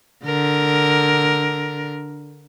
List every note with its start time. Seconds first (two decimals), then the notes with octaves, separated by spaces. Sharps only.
0.24 D3 A#4